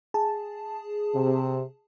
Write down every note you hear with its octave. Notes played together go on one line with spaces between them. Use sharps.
G#4 A5
C3